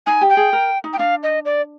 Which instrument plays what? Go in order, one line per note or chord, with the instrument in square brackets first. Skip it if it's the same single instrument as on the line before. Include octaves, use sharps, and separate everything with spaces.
[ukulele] D#4 [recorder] G#5
[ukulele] G4
[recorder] G5
[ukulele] G#4
A#4
D#4
[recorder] G5
[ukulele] D4 [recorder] F5
[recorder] D#5
D5